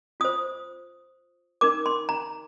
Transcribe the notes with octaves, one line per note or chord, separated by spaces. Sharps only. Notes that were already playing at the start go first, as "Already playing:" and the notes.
F4 C5 D#6
D#4 A#4 D6
C6
A#5